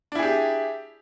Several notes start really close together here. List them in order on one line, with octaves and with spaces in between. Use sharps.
D4 E4 G#4 G4